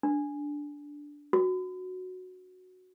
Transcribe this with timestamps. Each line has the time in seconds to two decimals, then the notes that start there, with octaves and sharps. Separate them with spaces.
0.03 D4
1.33 F#4